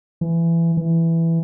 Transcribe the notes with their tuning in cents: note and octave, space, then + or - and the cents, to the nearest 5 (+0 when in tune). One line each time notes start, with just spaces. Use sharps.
E3 +20
E3 +5